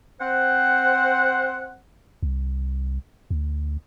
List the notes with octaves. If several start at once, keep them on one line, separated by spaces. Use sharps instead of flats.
C4 C5 F#5
C2
D2